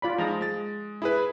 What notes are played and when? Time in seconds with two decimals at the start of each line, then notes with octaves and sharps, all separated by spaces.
0.02 F4 D5 B5
0.18 F3 G#3 D#4 A#5
0.41 G#3 A6
1.02 E4 G#4 B4